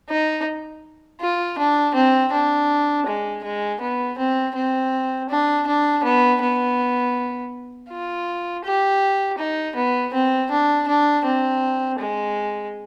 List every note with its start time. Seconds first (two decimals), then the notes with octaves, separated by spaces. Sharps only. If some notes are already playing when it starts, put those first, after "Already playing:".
0.09 D#4
1.21 F4
1.58 D4
1.94 C4
2.33 D4
3.07 G#3
3.44 G#3
3.81 B3
4.18 C4
4.55 C4
5.30 D4
5.67 D4
6.04 B3
6.41 B3
7.90 F4
8.64 G4
9.38 D#4
9.76 B3
10.14 C4
10.51 D4
10.88 D4
11.25 C4
11.99 G#3